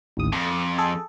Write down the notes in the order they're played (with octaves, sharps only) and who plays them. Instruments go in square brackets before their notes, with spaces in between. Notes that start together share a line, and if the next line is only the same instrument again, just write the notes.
[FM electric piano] A1 D#2 D#6
[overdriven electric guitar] F2 [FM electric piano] D6
[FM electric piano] G#4 A4